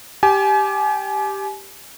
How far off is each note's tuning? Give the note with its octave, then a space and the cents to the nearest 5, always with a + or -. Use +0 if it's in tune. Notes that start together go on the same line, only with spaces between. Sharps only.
G4 +0 G#5 +35